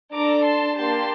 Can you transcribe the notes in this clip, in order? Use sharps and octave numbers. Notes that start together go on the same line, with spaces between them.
D4 A4 A#5 D6
A5 C6
A#3 D4 G4 A5 C6